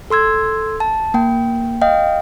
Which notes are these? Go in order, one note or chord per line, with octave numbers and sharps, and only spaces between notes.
A4 C6 E6 G#6
A5
A#3 G5
D#5 F5 G5